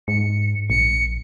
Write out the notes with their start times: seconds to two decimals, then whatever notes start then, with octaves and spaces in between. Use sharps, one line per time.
0.08 G#2 C#7
0.70 A#1 C#7